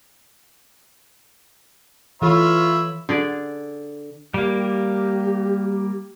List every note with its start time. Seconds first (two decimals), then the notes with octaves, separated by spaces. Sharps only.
2.22 E3 F4 A4 C#5 E5 B5
3.09 D3 G#4 D5
4.34 G3 A#3 G4